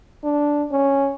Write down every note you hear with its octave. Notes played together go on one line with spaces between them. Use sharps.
D4
C#4